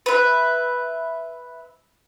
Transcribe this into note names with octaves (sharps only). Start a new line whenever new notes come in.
B4 E5